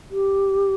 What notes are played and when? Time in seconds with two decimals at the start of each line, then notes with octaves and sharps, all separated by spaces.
0.11 G4